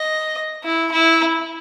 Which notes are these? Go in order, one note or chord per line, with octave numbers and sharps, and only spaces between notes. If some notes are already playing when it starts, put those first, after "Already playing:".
Already playing: D#5
E4
E4